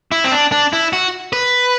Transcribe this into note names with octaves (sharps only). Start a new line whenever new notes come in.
E4
C4
D4
D4
E4
F#4
B4